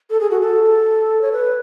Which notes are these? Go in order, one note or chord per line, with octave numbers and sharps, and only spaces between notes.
A4
G#4
F#4
A4
C#5
B4